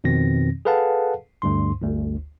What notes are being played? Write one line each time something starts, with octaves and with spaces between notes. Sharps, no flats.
F2 B2 D#3 C4 A#6
G#4 A4 B4 F5 F#5 A5
D2 G2 C6
G1 D2